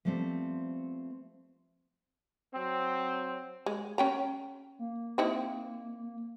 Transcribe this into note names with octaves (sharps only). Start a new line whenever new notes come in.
F3 G3 A3 B3 C4
F#3 C4
G#3
C#4 G5 A#5
A#3
C4 D#4 E4